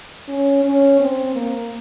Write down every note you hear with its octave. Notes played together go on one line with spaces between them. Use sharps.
C#4
C#4
C4
A#3